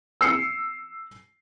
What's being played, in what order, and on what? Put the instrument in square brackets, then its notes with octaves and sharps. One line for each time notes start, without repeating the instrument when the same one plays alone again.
[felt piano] E6 C7 C#7